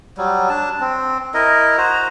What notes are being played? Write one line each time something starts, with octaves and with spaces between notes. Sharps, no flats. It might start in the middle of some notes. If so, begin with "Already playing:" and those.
F#3 G3
D4 A5
C4
E4 A#4 D#5
F#4 C5 A#5